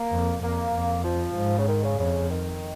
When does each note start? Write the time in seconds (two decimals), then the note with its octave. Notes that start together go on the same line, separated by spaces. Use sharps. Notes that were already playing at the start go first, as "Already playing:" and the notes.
Already playing: A#3
0.11 F2
0.43 F2 A#3
0.74 F2
1.04 F3
1.35 G#2
1.58 C#3
1.68 D#3
1.83 C#3
1.99 F2 C#3
2.29 D#3